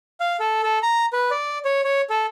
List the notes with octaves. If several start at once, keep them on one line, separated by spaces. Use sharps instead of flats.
F5
A4
A4
A#5
B4
D5
C#5
C#5
A4